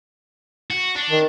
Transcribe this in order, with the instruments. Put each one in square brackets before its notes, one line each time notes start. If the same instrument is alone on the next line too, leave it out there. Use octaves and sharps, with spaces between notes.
[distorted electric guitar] F#4
D4
[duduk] D#3